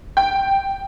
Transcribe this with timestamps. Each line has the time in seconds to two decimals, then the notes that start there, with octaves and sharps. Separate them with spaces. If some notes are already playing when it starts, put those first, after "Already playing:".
0.17 G5